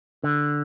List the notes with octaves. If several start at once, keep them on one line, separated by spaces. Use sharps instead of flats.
D3